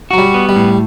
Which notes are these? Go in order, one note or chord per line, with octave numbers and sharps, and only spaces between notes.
F#3 F#4
G3
B3
G3
A2